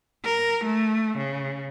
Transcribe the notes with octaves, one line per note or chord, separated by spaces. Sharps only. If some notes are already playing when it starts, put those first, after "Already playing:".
A#4
A3
C#3